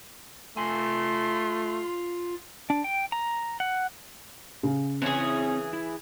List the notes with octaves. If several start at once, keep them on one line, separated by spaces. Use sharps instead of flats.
A3 F4 G#5 C6
D4
G5
A#5
F#5
C#3
E3 C4 G#4 C#5 G#5
E4